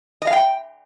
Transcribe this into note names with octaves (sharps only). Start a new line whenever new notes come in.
D#5
F5
G5